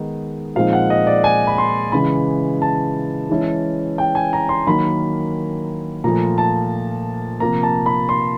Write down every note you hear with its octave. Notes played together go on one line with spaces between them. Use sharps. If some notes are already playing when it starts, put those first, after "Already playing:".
Already playing: D#3 G#3 B3 D#4
A#2 F3 G#3 C4 D#4 F5
F#5
D#5
D5
G#5
B5
C6
C#3 E3 G#3 B5
A5
E3 G#3 C#4 E4
G5
G#5
A#5
C6
D#3 F#3 A#3 B5
A#2 F3 A3 A#5
A5
C3 F3 A#3 A#5
A5
B5
C6